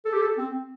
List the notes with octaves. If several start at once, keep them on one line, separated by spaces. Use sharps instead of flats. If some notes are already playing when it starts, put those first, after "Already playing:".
A4
G4
A4
C4